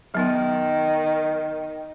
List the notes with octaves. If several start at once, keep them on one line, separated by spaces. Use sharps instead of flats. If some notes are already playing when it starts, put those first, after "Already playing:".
D#3 F#3 B3 D#4